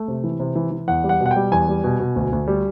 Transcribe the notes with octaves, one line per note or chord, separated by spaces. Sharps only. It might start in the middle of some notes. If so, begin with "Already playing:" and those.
Already playing: A3
C3
E3
C3
E3
E3
E2 F#5
G3
F#5
B2
F#5
G5
G3
E2 G#5
G3
B2
B2
D2
D2
G3